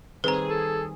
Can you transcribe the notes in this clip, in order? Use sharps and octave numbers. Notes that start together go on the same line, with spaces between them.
D#3 G3 C4 G#4 B4 A#5
A4